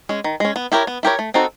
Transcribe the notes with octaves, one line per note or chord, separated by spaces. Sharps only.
G#3 C#4
D#3
G#3 C#4
B3
E4 G4 A#4 C#5
B3
E4 G4 A#4 C#5
A3
C4 D#4 F#4 A4